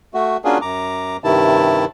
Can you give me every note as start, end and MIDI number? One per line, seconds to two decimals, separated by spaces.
0.14 0.37 57
0.14 0.37 66
0.45 0.58 58
0.45 0.58 61
0.45 0.58 62
0.45 0.58 65
0.45 0.58 66
0.45 0.58 68
0.61 1.17 42
0.61 1.17 82
0.61 1.17 86
1.24 1.85 43
1.24 1.85 48
1.24 1.85 51
1.24 1.85 64
1.24 1.85 81